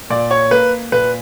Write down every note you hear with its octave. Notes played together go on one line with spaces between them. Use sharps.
A#2 D5
C#5
A#3 B4
A#2 B4